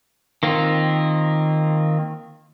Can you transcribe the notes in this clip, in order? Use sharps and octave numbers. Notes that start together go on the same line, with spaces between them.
D#3 A#3 C4 F4